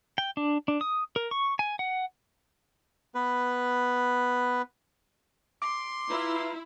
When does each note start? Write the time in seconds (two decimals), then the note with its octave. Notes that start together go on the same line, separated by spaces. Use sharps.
0.18 G5
0.37 D4
0.68 D4
0.81 D#6
1.16 A#4
1.31 C#6
1.59 G#5
1.79 F#5
3.15 B3 B4
5.62 C6 D6
6.09 E4 F4 B4 A#5